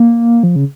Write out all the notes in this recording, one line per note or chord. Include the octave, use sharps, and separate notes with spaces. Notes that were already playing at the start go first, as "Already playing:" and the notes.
Already playing: A#3
F3
C#3